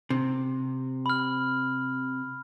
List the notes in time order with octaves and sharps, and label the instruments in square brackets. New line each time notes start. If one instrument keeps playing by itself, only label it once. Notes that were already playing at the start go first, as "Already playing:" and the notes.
[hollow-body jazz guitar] C3
[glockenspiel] B5 F6